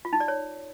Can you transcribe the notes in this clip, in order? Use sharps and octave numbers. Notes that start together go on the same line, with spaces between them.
F4
D#4
D5
C#5